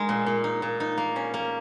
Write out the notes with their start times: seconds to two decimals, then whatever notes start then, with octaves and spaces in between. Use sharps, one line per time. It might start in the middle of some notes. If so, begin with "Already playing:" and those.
Already playing: G#3 D#4 A#4
0.09 A#2
0.26 A#2
0.44 D#4
0.62 A#2
0.80 D#4
0.98 A#3
1.16 C#4
1.34 A#3